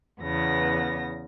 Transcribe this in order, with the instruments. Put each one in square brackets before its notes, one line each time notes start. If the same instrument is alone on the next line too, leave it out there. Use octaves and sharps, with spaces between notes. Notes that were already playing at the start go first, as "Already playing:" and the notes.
[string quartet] E2 C#3 B3 A#6